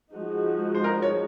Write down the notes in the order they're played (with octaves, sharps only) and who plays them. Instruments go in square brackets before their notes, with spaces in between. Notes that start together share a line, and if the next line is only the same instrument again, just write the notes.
[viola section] F3 G#3 D#4 F#4
[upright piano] C5
A#4
C#5